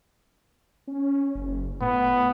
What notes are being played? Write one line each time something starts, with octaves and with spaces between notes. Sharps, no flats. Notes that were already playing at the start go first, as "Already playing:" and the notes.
C#4
F#1
A2 B3